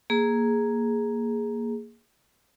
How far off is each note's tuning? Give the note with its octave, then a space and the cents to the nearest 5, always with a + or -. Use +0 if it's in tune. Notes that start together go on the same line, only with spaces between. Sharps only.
A#3 +0 G#4 +0